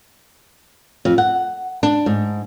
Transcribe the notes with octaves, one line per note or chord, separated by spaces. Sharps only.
F2
F#5
D4
G#2